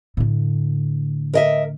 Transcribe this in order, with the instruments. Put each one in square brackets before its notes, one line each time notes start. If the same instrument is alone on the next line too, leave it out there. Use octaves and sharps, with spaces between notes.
[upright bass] A2 D3
[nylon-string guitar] A#4 D#5 E5